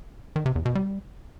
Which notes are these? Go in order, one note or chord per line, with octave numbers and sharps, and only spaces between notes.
D#3
C3
E2
B2
G3